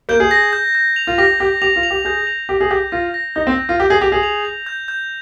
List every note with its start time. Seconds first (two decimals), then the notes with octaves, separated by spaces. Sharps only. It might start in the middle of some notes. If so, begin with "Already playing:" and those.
0.09 A#3 G6
0.20 G#4
0.31 A#6
0.53 G6
0.75 G6
0.96 F7
1.07 F4
1.18 G4 A#6
1.40 G4 G6
1.62 G4 F7
1.76 F4
1.83 F7
1.90 G4
2.05 G#4 G6
2.27 F7
2.49 G4 F7
2.61 G#4
2.71 G4 G6
2.92 F4 A#6
3.14 A#6
3.36 D#4 G6
3.47 C4
3.58 G6
3.69 F4
3.79 G4 G6
3.90 G#4
4.01 G4 F7
4.12 G#4
4.23 F7
4.45 F7
4.66 G6
4.88 G6